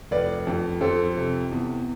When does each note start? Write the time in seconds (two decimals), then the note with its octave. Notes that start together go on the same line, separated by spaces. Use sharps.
0.11 F1 B4 D5
0.47 F2
0.81 F2 A4 C5
1.17 C3
1.51 E2